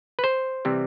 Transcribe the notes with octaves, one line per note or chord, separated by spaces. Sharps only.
B4
C5
C3 E3 G3 C4